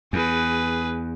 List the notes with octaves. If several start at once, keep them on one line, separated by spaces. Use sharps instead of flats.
E2 G#4 B4